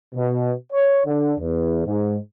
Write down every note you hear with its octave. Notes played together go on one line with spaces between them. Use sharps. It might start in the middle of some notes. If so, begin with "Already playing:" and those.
B2
C#5
D3
E2
G#2